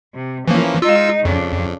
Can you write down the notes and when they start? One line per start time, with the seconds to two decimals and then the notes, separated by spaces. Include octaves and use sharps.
0.15 C3
0.48 E3 F3 A#3 C#4
0.82 G#3 D#4 F4 E6
1.25 F2 C#3 D4